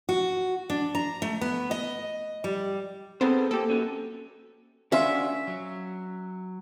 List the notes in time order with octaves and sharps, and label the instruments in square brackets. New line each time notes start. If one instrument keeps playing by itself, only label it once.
[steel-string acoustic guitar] F#4
D4
A#5
A3
B3
D#5
G3
[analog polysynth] B3 C4 [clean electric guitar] G#4 A4 C5
[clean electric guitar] A#3 [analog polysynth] G4 A4
[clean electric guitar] C#4 F#4
[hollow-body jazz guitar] C#4 F5 C6 [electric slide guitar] D4 F#4 [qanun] E5
[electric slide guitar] F#3